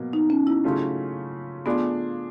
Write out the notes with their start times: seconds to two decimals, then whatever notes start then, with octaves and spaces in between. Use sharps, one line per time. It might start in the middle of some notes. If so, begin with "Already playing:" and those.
Already playing: B2 F#3 A#3
0.13 D#4
0.30 C#4
0.47 E4
0.64 C#3 F#3 A3 C#4 F4
1.66 F3 A3 B3 D4 F4 G#4